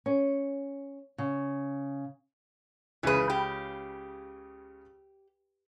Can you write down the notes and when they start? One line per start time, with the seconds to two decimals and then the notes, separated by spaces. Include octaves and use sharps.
0.06 C#4
1.18 C#3
3.03 C#2 C#3 E3 G#4 B4
3.30 G4